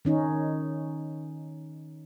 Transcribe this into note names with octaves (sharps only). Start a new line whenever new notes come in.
D#3 C#4 D#4